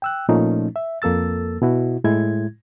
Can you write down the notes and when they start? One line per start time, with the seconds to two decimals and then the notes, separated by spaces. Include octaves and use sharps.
0.02 G5 E6 F#6
0.29 A#2 F3 A3 C#4 D#4
0.76 E5
1.02 F2 A#3 A4 E6 A6
1.62 B2 E4 F#4
2.04 A2 G#3 E4 G#6